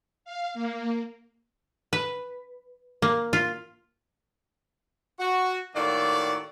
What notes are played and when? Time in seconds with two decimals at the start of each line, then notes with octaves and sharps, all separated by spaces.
0.25 F5
0.54 A#3
1.93 B4
3.02 A#3
3.33 F4
5.19 F#4
5.76 A2 D#3 A#3 F#4 A4 D5